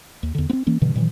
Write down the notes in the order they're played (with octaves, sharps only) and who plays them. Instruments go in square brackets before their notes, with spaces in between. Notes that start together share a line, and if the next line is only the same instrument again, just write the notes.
[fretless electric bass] D#2
E2 D3
B3 C4
E3 A#3 C#4
G2 B2 D3 E3
A#2 D#3 E3 F#3